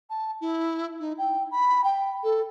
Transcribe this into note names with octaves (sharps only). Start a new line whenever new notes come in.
A5
E4
D#4
G5
B5
G5
A4